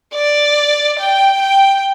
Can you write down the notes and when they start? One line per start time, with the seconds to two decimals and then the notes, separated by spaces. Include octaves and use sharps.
0.14 D5
0.99 G5
1.41 G5